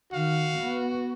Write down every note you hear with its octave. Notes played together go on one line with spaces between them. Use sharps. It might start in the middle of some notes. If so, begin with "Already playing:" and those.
D#3 F#4 F5
B3